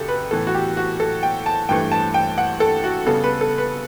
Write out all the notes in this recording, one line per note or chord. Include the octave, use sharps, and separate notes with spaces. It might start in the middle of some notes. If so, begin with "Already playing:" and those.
Already playing: F#2 C#3 G4 A4
B4
A2 E3 B3 A4
F#4
G4
F#4
A4
G5
A5
G2 E3 A3 G5
A5
G5
F#5
A4
F#4
C#3 G3 B3 A4
B4
A4
B4